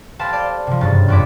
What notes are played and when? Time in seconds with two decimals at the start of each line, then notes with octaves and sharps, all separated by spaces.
0.19 G4 A4 B4 C5 F5 A5
0.33 D5 F5 G6
0.67 C3 F3
0.81 F#1 G2 A6
1.08 E1 F2 B3 C4 D6 B6